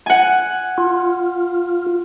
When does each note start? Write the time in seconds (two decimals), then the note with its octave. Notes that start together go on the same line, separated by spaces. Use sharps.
0.06 F#5 G#5
0.78 F4